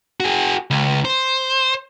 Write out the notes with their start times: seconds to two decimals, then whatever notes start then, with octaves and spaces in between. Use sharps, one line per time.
0.20 F#4 G#4
0.70 C#2
1.05 C5